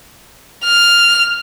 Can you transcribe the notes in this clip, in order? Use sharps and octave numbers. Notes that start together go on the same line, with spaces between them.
F6